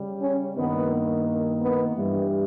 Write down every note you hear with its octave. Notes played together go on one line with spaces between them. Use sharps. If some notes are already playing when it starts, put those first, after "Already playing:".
Already playing: C#3 G3
C#4
G2 D#3 A#3 B3
B3
G2 E3 G3